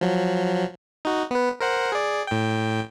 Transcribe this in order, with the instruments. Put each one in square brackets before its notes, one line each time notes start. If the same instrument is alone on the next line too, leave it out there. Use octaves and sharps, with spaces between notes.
[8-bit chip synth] F3 F#3
D#4 F#4
B3 B4
A#4 C5 F#5
G#4 D5
A2 G5